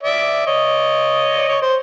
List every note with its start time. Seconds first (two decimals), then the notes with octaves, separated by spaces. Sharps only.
0.03 D5 E5
0.47 C#5 D#5
1.36 D5
1.48 C#5
1.62 C5